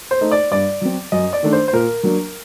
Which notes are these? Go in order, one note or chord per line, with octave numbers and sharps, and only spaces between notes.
C5
A3 D#4
D5
G2 D5
F#3 C4
F#2 D#5
D5
D#3 A3 D4
C5
C5
A#2 A#4
F#3 A#3 D4